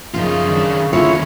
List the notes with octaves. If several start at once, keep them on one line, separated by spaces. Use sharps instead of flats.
F#2 C#3 F3 D#4 F4
D#3 D4
D#2 D3 C#4 E4 F4 C#5